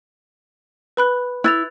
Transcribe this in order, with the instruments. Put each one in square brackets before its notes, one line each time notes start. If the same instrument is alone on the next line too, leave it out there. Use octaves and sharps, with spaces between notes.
[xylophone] B4 B5 F#6
[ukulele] E4 [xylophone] F#6 A6 F7